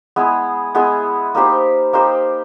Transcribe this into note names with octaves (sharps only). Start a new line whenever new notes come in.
G#3 B3 E4 G#4
G#3 B3 E4 G#4
A#3 D#4 G4 C5
A#3 D#4 G4 C5